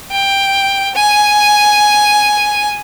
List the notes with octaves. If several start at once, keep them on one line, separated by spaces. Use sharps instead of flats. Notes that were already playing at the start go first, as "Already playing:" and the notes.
G5
G#5